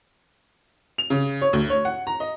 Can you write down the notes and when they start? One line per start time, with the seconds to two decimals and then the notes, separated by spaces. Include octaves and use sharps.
0.98 F7
1.10 C#3
1.42 C#5
1.53 D2
1.70 C#5
1.85 F#5
2.07 A#5
2.20 D#5